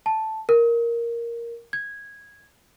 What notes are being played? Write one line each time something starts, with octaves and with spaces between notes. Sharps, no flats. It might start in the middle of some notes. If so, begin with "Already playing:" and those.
A5
A#4
G#6